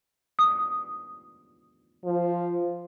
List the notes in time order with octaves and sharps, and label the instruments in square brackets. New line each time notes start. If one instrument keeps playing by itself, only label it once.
[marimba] D#6
[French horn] F3